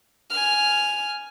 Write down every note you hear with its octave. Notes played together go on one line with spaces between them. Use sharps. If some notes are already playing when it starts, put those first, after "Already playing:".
G#5 F6